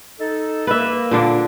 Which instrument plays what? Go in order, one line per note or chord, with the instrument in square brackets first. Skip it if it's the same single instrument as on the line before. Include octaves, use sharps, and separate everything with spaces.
[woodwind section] D#4 A4
[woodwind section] A#3 [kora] B4 E5
[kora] A#2 D3 D4